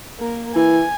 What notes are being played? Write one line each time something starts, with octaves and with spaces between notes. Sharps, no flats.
A#3 A#4
E3 G#5